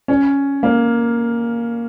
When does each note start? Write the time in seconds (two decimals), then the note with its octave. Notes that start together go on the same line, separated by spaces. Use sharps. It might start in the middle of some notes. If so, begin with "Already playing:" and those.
0.08 C#4
0.63 A#3